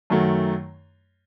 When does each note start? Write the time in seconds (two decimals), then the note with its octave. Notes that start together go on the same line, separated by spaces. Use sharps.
0.10 F#2 D#3 F#3 A3